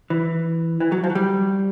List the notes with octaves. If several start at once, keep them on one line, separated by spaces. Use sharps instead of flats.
E3
E3
F#3
F3
F#3
G3